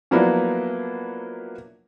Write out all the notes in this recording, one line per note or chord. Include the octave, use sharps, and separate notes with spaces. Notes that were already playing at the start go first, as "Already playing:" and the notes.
F3 F#3 A#3 B3 D4 E4